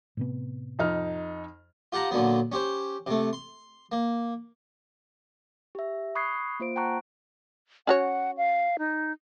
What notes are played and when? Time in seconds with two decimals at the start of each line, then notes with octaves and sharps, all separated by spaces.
0.17 A2 C3 B3
0.79 F2 D#4 F6
1.92 F4 G4 F#5 A5 A#5
2.11 A#2 D3 F#3 B3
2.52 C#4 G4 C5
3.07 C3 A3
3.33 C6
3.92 A#3
5.75 G4 E5
6.15 B5 C#6 D#6 F#6 G#6 C7
6.60 A#3 F4 C5 D7
6.76 F#5 G5 A5 A#5 C#6 F#6
7.87 C#4 F#4 C#5 F#5
8.37 F5
8.79 D#4